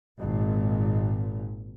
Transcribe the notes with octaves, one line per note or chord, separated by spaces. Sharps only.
G#1 A#2